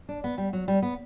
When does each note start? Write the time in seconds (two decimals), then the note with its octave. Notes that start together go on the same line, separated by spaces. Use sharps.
0.09 D4
0.24 B3
0.38 G3
0.53 F#3
0.68 G3
0.82 B3